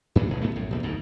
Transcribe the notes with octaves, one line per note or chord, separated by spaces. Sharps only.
F#2 A#2 D#3 F#3
D#1 B2 D#3
G2 A3 B3
A#1 F#2 A2
B1 E2 A#3
F#1 D2 G#2 D#3